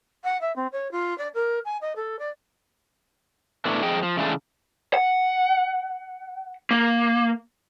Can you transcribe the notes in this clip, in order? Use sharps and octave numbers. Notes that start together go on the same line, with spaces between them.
F#5
E5
C4
C#5
F4
D5
A#4
G#5
D#5
A4
D5
B2 A3 D4 E4
F2 G#4 D#5 G5
F3
C#3 E3 G#3 A3 D4
F#5
A#3